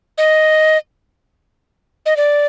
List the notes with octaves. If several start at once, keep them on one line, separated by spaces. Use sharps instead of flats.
D#5
D#5
D5